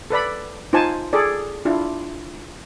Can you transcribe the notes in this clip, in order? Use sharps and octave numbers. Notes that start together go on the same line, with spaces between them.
A4 B4 D5 B5
D#4 F4 C5 G#5 A5
G#4 A4 D5
D4 E4 F4